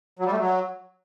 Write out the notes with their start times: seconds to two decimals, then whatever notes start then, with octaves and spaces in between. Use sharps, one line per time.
0.19 F#3
0.26 G3
0.32 A3
0.38 F#3